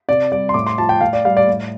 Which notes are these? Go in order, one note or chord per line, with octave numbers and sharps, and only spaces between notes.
C3 D5
G3 D5
C6
A2 D6
C6
F3 A5
G5
A2 F5
D5
G3 F5
D5
A2